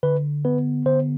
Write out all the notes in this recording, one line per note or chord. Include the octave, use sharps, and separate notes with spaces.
D3 B4
B3 B4
D3 C5